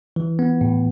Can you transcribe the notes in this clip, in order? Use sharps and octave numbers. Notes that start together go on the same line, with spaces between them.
E3
B3
A2